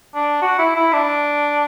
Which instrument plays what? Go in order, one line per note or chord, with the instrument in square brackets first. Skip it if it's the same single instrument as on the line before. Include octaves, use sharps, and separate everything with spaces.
[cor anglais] D4
F#4
E4
E4
D4